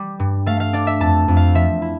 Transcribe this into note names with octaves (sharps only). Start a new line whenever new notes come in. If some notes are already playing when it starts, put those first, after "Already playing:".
Already playing: G3
G2
A3 F5
F5
D4 D5
E5
F2 A5
F2
F5
F3 E5
E4